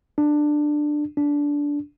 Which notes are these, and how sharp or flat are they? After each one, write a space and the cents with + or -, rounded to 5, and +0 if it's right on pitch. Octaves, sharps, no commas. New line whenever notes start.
D4 +15
D4 -15